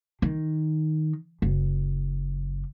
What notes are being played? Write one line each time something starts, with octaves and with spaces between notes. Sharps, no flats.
D#3
F#1